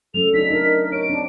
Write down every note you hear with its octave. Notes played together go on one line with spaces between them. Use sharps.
F#3 A3 C#4 A4 F7
D4 D#4 B6
D#4 A#4
C#5 D7
C4 D4